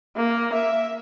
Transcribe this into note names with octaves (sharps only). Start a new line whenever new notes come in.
A#3
E5